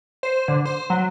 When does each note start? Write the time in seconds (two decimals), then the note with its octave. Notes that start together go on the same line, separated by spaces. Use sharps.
0.23 C5
0.48 D3
0.65 C5
0.90 F#3